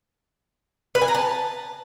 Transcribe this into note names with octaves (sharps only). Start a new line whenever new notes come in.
B4
G#5
A#5
A5